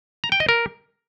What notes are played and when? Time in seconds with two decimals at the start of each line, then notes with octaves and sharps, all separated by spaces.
0.24 A#5
0.32 G5
0.40 D#5
0.49 A#4